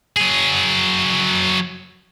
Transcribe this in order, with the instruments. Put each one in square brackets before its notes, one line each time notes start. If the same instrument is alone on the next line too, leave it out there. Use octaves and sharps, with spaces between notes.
[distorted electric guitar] F#3 G#4